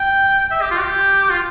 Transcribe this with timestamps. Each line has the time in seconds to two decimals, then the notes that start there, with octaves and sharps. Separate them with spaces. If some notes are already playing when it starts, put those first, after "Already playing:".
Already playing: G5
0.51 E5
0.61 G4
0.71 F4
0.80 G4
1.31 F4